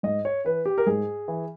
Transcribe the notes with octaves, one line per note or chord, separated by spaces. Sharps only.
G#2 D#5
C#5
E3 B4
G4
A#4
G#2 G#4
E3